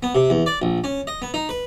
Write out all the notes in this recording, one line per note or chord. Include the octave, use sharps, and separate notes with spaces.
B3
C3
E2
D5
A#1
C#4
D#5
B3
D#4
B4